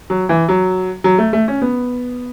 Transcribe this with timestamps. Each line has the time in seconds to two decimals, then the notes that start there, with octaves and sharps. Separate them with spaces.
0.10 F#3
0.29 E3
0.49 F#3
1.04 F#3
1.18 A3
1.33 A3
1.48 C#4
1.62 B3